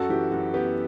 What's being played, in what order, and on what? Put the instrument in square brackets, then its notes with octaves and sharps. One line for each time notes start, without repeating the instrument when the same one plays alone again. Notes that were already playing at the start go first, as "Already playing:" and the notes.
Already playing: [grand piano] F#2 F#4 A4
E3 G4
F#2 F#4
B3 G4